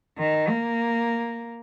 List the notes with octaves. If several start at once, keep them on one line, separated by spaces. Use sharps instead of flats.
D#3
A#3